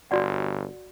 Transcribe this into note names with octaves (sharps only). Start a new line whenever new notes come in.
G1 F#4 D5 F#5